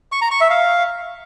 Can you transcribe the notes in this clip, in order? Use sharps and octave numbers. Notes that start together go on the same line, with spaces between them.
C#6
A#5
C#6
E5
F5